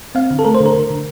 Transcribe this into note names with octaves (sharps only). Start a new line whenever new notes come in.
C4 F5
D3
A4
A3 A#4
C5
D3
A#4
D3
D3